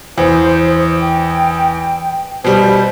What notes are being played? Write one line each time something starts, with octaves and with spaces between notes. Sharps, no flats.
E2 C5
G5
B2 G3 C5